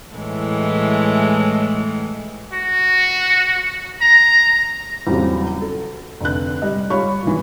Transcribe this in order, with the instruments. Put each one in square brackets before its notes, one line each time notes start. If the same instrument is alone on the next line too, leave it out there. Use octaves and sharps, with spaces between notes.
[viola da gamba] A2 E3 G#3
[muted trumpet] F#4
A#5
[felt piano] E2 A#2 C#3 F#3 G3 C4
A4
F1 D3 F#6
G3 D#5
G3 F4 C#5 B5 C#6
A#2 E3